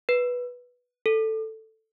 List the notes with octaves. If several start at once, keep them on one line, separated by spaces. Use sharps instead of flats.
B4
A4